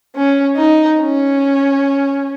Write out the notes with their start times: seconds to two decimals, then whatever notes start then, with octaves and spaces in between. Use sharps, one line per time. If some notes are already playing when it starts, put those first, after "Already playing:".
0.15 C#4
0.57 D#4
0.99 C#4